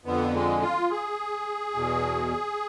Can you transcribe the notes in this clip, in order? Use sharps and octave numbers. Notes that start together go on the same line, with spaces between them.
F2 D3 B3
G#3
F4
G#4
E2 B2